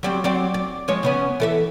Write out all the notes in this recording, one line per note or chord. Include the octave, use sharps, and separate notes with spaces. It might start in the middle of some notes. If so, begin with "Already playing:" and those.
F#3 G3 C4
F#3 C4 D5
D5
F3 G#3 C#5
C#3 B3 C#4
E3 A4 E5